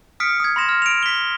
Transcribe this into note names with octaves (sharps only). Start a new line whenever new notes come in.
D#6 F6 B6 C#7 D7
D#6 G#6
B5 C6 A#6 E7
F6
D7 F7
B6 G7